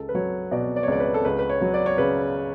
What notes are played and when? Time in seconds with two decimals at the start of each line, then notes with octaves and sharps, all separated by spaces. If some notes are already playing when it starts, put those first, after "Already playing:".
Already playing: C#2 A4
0.09 B4
0.15 F#3 C#5
0.51 B2 D5
0.76 D5
0.83 C#5
0.88 C#2 D5
1.00 B4
1.14 A4
1.25 C#2 B4
1.39 B4
1.50 C#5
1.61 F#3
1.74 D5
1.86 C#5
1.98 C#3 B4